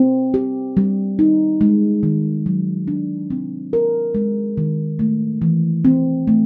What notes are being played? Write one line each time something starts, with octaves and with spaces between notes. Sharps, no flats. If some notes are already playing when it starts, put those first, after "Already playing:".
Already playing: C4
G4
G3
D#4
G#3
D#3
F#3
D4
C4
A#4
G#3
D#3
A3
E3
C4
A3